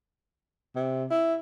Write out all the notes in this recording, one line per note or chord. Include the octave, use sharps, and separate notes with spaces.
C3
E4